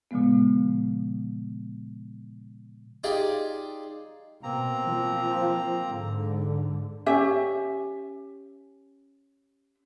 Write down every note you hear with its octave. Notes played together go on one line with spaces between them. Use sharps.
A#2 C#3 F3 G#3 B3
D#4 F4 G4 G#4 D5
B2 A#3 C4 A#5
F3
G#2 D3
C#4 G4 E5